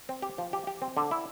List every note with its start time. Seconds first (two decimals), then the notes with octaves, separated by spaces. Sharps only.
0.09 C4
0.22 G4
0.38 F3
0.53 G4
0.67 G4
0.82 C4
0.97 D3
1.11 E4